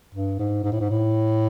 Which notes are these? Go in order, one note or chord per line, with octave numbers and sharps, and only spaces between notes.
G2
G#2
G#2
A2
G#2
A2